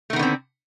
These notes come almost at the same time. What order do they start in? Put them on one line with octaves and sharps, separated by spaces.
A3 D#3 B3 D3 C4